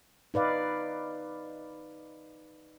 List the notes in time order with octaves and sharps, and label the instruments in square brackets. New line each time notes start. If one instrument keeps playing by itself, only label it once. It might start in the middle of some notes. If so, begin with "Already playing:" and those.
[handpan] D#4 B4 D5 F5